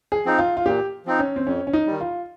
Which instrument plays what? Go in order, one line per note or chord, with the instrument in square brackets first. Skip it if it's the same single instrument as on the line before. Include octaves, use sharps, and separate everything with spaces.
[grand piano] G#4
[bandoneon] F3 C4 D#4
[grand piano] F4
F4
[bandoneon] A#2 [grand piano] G4
[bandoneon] F3 C4 D#4
[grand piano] C#4
C4
[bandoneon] F2 [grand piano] C#4
[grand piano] C#4
D#4
[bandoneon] D#3 G3
[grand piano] F4